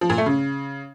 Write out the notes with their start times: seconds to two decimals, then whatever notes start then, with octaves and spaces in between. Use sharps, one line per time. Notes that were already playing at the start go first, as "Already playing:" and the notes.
0.01 F3
0.10 A#2
0.18 A3
0.26 C#3